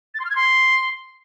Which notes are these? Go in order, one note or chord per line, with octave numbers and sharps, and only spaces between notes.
A6
C6
F6
G#6
C6